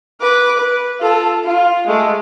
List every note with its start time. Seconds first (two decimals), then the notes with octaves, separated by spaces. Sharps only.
0.20 B4 D6
0.57 B4
1.00 F4 A4
1.44 F4
1.87 G#3 A3